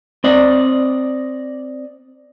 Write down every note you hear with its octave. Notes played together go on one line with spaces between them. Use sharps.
C4 D5 D#5